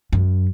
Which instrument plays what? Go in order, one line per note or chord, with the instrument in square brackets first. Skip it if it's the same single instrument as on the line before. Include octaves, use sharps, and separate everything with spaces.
[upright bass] F#2